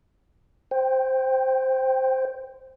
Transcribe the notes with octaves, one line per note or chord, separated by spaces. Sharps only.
C5 G5